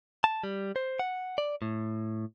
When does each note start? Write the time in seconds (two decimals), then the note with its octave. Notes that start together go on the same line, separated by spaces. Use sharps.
0.24 A5
0.44 G3
0.76 C5
0.99 F#5
1.38 D5
1.62 A2